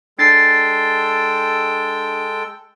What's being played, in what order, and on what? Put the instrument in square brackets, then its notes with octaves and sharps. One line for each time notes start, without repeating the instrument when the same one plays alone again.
[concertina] G#3 A4 G5 [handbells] D4 A6 C7